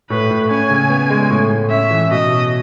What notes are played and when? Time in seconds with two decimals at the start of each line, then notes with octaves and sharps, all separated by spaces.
0.10 A2 B4
0.31 A2
0.50 C#4 G#5
0.70 C#3
0.90 B3
1.10 G#3
1.30 A2
1.50 A2
1.71 C#4 E5
1.91 E3
2.11 B2 D#5
2.30 B2